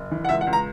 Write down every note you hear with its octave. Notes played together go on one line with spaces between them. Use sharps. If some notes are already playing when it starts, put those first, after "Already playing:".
Already playing: F#1
E3
F#5
C#2 E5
F#5
C#2
A#5